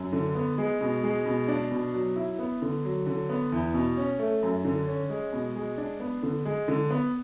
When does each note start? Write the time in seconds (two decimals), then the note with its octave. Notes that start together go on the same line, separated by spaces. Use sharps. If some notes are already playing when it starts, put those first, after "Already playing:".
Already playing: F#2
0.12 D3
0.35 B3
0.58 G#3
0.81 B2
1.03 G#3
1.25 B2
1.48 D4
1.71 B2
1.94 F#3
2.16 E4
2.39 B3
2.62 D3
2.84 F#3
3.06 D3
3.29 B3
3.52 E2
3.74 B2
3.97 C#4
4.19 A3
4.43 F#2
4.64 D3
4.87 C#4
5.10 G#3
5.32 B2
5.55 G#3
5.78 D4
6.00 B3
6.23 D3
6.45 G#3
6.68 D3
6.90 B3